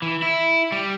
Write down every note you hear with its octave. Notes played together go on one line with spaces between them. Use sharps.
E3
E4
G3